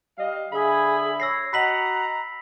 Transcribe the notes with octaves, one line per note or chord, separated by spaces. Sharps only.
G3 D#5 F5
D3 G#4 E5 B5
C#5 E6 A#6 C7
F#4 D#5 F#5 A#5 B5 B6 F#7